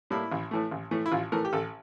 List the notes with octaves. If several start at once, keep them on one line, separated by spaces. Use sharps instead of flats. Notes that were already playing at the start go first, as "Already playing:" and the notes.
A2 G3 A#3 E4
A1
A2 E3 A3
A1
A2 E3 A3
E4
A1 F4
A2 E3 A3 A#4
G4
A1 A4